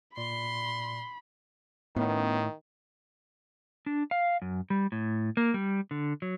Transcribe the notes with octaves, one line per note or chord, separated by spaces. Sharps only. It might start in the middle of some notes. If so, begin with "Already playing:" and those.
A#2 D5 B5 C6
A2 D#3 B3 C#4
D4
F5
F#2
G3
A2
A#3
G3
D3
F#3